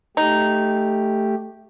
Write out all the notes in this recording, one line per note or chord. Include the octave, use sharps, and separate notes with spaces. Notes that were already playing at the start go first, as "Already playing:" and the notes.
A3 D#4 G4